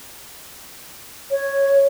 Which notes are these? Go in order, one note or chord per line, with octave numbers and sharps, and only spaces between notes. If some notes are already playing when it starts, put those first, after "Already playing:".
C#5